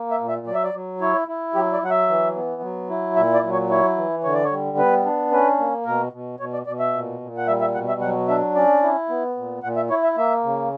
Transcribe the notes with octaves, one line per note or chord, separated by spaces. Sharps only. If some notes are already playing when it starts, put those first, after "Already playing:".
Already playing: A#3
E5
A#2
E5
F#3 D5
E5
D5
F#3
E4 C#5
E4
F#3 G4
D5
F#3 F#5
E5
E3
B3
F#3
E4
A#2 E5
D5
F#3
C#5
E4 C#5
E3
D3 C#5
D5
C#5
G3
B3 B4
D4
C#4 B4
A#3
B2 A#4
B2
B2 C#5
D5
B2 D5
E5
A#2
A#2
F#5
G3 E5
E5
B2 F#5
E5
F#3 F#5
D4 E5
C#4 D5
E4
B3
A#2
A#2 F#5
E5
E4 C#5
E5
A#3 E5
C#3